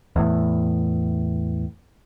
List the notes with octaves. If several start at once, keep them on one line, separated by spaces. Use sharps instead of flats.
E2 A2